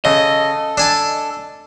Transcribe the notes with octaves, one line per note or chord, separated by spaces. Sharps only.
C#3 A4 D#5
D4 G#5 A5